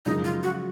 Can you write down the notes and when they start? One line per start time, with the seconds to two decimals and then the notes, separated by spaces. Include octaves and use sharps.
0.06 F#2 C#3 F3 G#3 D#4
0.24 F4
0.43 F#4